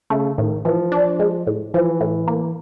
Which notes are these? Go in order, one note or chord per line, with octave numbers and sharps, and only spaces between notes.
C#3 A3
A2 D#3
E3 F3
D4
G#3
A2
E3 F3
A2
A#3